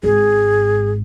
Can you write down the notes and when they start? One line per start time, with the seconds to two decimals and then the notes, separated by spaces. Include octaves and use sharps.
0.03 G#1 G#2 G#4